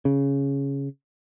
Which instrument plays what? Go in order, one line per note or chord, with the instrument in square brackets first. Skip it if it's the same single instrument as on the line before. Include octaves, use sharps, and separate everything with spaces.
[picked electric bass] C#3